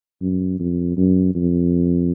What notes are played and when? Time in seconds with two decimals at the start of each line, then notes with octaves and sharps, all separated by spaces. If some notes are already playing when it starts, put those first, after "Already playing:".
0.22 F#2
0.60 F2
0.97 F#2
1.35 F2